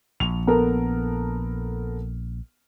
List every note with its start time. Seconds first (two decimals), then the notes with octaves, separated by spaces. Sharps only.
0.20 A#1 F7
0.47 B3 A4 A#4